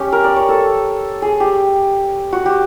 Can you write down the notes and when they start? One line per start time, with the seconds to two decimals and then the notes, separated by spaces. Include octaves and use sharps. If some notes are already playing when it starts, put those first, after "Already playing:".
Already playing: C#4 G4
0.12 A#4
0.24 D5
0.36 C#5
0.49 A4
1.22 G#4
1.40 G4
2.32 F#4
2.46 G4